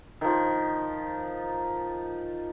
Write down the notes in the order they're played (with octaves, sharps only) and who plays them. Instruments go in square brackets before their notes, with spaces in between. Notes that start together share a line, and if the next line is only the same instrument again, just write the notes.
[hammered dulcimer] D#3 F3